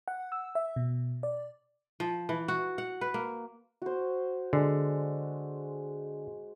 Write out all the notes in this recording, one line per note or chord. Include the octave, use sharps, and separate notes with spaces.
F#5
E6
E5
B2
D5
F3
E3
F#4
F#5
B4
A#3
F#4 C5
D3 G#3